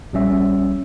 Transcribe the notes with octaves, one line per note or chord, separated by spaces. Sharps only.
A#1 G3 C#4 E5